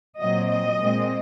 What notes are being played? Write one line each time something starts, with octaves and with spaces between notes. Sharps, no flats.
A#2 F#3 C4 D#5
D#5
A#2 G#3 C4